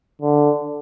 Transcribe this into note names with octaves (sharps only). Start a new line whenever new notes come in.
D3